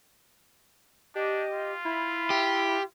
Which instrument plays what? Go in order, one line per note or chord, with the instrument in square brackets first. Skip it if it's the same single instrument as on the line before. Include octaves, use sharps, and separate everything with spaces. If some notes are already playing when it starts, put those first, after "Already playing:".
[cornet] D4 [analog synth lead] G4 [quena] D#5
[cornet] F4
[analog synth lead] E4 [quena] B5
[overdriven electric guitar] G4